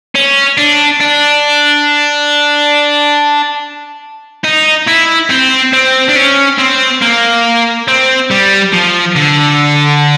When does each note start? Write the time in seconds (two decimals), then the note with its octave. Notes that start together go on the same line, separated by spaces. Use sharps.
0.15 C#4
0.58 D4
1.01 D4
4.44 D#4
4.87 E4
5.30 C4
5.73 C4
6.09 D4
6.16 C#4
6.59 C4
7.02 A#3
7.88 C4
8.31 G3
8.74 F3
9.16 D3